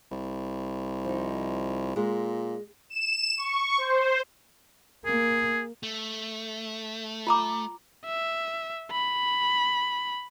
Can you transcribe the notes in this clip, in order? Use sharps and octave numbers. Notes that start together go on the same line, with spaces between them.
C2
F3 D#4
A#2 G#3
E7
C#6
C5
A#3 G#4
A3
F4 A#5 D6
E5
B5